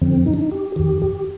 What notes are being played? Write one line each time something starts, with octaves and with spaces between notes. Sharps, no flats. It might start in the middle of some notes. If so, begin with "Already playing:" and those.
F2 D3 F3 C4
D#4
D4
D#4
G4
F2 D#3 G4
G4